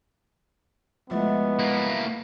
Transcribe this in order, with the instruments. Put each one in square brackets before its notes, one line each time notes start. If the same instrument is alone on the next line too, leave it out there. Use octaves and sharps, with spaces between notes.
[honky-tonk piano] C2 F3 A3 [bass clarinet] G#3 [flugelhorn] B3
[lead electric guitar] A#3 E4